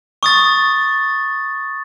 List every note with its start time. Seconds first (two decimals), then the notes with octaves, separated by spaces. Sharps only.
0.23 C#6 D#6 A6